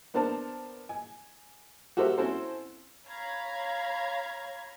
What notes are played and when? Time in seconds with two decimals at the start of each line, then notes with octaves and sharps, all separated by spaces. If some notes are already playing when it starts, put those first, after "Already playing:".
0.14 B3 D4 A#4 C5 A5
0.89 G#5
1.97 F#4 G4 A4 A#4 C5 E5
2.18 C4 C#4 E4 F#4 A4 C5
3.06 C#5 F5 A#5 B5 G#6